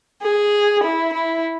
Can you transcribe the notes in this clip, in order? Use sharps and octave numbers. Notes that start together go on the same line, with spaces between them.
G#4
E4
E4